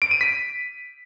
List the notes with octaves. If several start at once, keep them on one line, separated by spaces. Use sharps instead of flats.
D7
D#7
B6